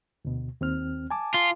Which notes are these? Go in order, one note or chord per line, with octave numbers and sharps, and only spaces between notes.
D2 B2
D#2 C4 F6
G#5 A5 D6
F4